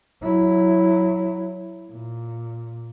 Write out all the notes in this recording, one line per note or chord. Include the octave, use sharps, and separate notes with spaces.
F#3 E4
A#2